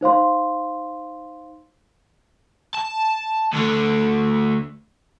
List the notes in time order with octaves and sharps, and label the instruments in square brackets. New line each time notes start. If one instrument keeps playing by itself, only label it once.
[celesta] D#4 C5 F5 C6
[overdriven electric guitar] A5
D2 D3